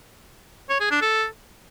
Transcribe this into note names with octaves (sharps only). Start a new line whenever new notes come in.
C#5
G#4
D4
A4